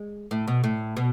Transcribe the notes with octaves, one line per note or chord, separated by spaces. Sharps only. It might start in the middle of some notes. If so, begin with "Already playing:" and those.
Already playing: G#3
A2
B2
A2
B2